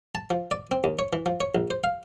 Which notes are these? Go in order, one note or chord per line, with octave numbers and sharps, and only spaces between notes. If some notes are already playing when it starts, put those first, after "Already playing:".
A5
F3
D5
C4
D#2
C#5
E3
F3
C#5
A#1
C5
F5